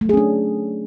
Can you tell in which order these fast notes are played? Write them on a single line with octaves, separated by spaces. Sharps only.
A3 F#3 G#4 C#4 D4